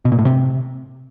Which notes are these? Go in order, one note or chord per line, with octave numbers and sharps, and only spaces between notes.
B2
A#2
A2
C3